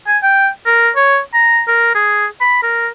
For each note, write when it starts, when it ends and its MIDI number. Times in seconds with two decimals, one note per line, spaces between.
0.07 0.18 80
0.23 0.49 79
0.66 0.90 70
0.96 1.19 73
1.34 1.62 82
1.68 1.92 70
1.95 2.26 68
2.41 2.58 83
2.63 2.88 70